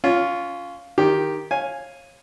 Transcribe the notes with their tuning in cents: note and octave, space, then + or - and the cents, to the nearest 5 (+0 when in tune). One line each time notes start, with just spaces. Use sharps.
C#4 +20 F4 +0
D#3 -5 G4 +0
C#5 -25 F5 +0 G#5 +0